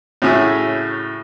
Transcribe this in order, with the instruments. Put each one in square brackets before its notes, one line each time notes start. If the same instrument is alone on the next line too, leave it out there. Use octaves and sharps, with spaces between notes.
[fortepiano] A2 C#3 F#4 C#5 E5 G#5